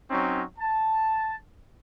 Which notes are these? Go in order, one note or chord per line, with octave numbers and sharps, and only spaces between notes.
F#3 C4 C#4 D#4
A5